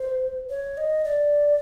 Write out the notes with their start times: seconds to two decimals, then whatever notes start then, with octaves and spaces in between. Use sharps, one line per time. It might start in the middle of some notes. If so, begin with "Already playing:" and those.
Already playing: C5
0.50 C#5
0.78 D#5
1.04 D5